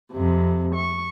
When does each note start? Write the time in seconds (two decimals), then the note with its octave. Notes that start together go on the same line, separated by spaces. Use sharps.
0.12 F2 C3
0.75 C#6